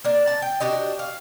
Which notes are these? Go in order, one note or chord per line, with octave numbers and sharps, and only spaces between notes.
A#3 D4
A5
G5
D4 F#4 G4 D#5
F5